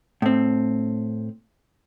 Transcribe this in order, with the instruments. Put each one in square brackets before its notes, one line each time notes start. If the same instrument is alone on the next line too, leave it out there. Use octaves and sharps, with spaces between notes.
[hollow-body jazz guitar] A2 C4